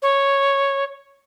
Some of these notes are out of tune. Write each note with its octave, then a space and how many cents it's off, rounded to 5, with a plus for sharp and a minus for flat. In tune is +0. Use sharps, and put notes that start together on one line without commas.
C#5 -5